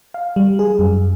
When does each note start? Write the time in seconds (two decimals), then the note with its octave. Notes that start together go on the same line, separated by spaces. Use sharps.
0.14 F5
0.36 G3
0.59 G#4
0.79 F#2